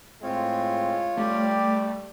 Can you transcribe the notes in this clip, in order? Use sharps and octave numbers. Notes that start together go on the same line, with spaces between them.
A2 G#3 C4 F4 C#5
G3 A3 G4 D5